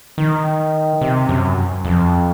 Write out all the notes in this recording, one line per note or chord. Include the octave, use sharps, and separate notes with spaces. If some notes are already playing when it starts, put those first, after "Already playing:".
D#3
C3
F#2
F2